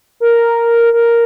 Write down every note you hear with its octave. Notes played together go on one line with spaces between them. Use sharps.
A#4
A#4